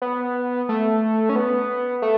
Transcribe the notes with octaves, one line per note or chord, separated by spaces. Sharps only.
B3
A3
C#4
B3
A3